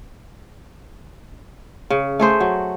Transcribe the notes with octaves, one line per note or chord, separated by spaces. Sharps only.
C#3
A3 G#4 C5
F#3